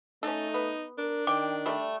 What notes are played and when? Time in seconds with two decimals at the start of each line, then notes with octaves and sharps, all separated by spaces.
0.23 A3 C#4 D#4 A4
0.54 B3
0.98 D4 A#4
1.27 D#3 G5 D6
1.66 G3 A3